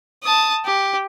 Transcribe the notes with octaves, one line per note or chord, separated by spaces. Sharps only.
A5 D#6
G4